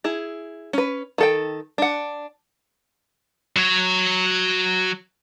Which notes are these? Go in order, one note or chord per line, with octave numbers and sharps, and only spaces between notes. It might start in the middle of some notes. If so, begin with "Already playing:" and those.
E4 G#4
C#4 B4
D#3 A4 G5
D4 F#5
F#3 C#5